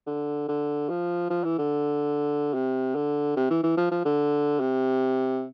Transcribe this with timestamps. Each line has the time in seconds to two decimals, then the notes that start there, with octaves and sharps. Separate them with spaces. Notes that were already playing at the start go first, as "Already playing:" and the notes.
0.07 D3
0.48 D3
0.90 F3
1.30 F3
1.44 E3
1.58 D3
2.54 C3
2.95 D3
3.37 C3
3.50 E3
3.63 E3
3.77 F3
3.91 F3
4.05 D3
4.60 C3